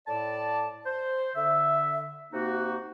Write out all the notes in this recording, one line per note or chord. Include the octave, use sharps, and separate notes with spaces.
A2 D5 A5
C5
D3 E5
C3 A#3 D#4 F#4